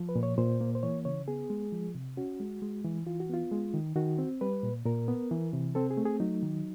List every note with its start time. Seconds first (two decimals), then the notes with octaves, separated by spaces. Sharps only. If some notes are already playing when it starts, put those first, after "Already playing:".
Already playing: F3
0.09 B4
0.16 A#2
0.23 C#5
0.38 A#2 C5
0.61 A#3
0.75 C5
0.83 E3 C#5
1.05 C#3 C#5
1.28 B3 G#4
1.50 G#3
1.72 F3
1.95 C3
2.17 C#4 F#4
2.40 G#3
2.62 G#3
2.84 E3
3.07 E3 F4
3.20 F#4
3.30 B3 F4
3.52 G#3
3.74 D#3
3.96 D#3 F#4
4.18 C4
4.41 G3 B4
4.63 A#2
4.86 A#2 A#4
5.08 B3
5.31 E3
5.53 C3
5.75 C4 A4
5.91 G#4
5.97 A3
6.05 G#4
6.20 F#3 D#4
6.43 D#3